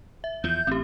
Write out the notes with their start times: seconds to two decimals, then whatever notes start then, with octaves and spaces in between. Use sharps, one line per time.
0.24 E5
0.44 E2 F3 G6
0.67 A1 C4 G4